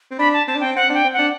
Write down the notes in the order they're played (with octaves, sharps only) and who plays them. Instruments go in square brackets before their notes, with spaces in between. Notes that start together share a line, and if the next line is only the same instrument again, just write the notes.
[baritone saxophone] C4
[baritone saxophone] D4 [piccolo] B5
[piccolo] A5
[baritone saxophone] C4 [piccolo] A5
[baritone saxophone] D4
[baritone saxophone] C4 [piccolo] G5
[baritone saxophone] C4 [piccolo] F#5
[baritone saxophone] D4 [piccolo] G5
[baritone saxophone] C4
[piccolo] F#5
[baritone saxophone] D4